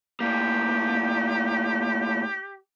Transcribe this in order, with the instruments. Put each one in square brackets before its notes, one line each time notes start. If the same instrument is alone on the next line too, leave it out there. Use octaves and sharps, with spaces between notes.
[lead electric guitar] A2 A#3 [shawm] G4